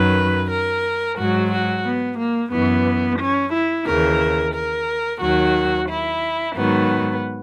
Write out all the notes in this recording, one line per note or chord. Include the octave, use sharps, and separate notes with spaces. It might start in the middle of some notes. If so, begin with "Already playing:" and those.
Already playing: F#2 D#3 F#3 B4
A#4
G#2 F#3 F#4
F#4
B3
A#3
F#2 E3 B3
C#4
E4
D#2 C#3 E3 A#4
A#4
D#2 D#3 F#3 F#4
E4
G#2 D#3 F#3 B3